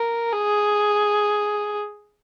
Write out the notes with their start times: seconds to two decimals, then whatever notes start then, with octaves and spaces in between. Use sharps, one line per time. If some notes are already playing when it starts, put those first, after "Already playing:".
Already playing: A#4
0.33 G#4